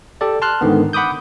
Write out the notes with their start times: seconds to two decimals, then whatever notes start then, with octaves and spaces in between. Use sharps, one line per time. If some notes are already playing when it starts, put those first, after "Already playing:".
0.21 G4 A4 D5
0.42 A5 C6 F6 F#6
0.61 G#2 D3 D#3 B3
0.93 F#5 B5 D6 D#6 G6